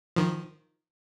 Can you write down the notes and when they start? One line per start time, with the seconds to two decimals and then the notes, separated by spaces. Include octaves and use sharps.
0.16 D#3 F3